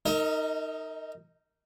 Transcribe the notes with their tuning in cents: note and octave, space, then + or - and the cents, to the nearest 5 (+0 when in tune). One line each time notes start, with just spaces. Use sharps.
D#4 +0 A#4 -25 D#5 +45